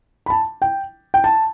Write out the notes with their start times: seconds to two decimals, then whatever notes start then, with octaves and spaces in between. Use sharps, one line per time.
0.26 B5
0.30 A5
0.62 G5
1.14 G5
1.24 A5